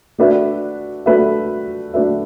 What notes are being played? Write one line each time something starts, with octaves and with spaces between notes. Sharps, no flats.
A3 D4 F#4 B4 E5
A3 D4 F#4 B4 E5
A3 D4 F#4 B4 E5